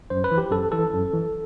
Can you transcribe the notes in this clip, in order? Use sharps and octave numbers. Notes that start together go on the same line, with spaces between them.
F#2 C5
B4
E3
G4
F#2 A4
E3 A4
F#2
E3